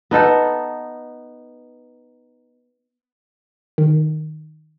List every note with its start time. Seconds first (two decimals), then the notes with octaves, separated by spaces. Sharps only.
0.11 B3 D#4 A4 F#5
3.78 D#3